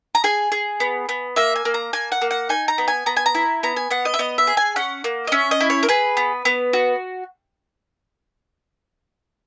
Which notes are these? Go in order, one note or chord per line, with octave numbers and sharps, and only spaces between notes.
A#5
G#4 G#5
G#4
B3
B3
A#3 E5
G#5
A#3
A#5
A#3 G#5
F#5
A#3
F#5
D#4 G#5
A#5
B3
G#5
B3 A#5
G#5
A#5
E4
B3 A#5
G#5
B3 F#5
D#5
E5
B3 D#5
E5
G#4
G#5
C#4 F#5
A#3
D#5
C#4 E5
D#5
E4
C#5
A#4
G#4 B4
B3
B3
F#4